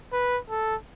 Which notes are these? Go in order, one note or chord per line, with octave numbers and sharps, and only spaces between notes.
B4
A4